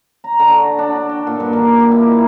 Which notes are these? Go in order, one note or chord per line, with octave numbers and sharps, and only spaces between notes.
A#5
D3
F#4
D4
D4
G5
A#2
G2
D#3
G4
E4
D#4